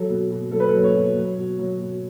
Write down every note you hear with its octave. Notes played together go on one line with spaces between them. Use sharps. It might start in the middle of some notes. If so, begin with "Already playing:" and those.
Already playing: F#3 A4
B2
B2
F#3 A4
B4
F#3 A4
C#5
B2
F#3
B2
F#3
B2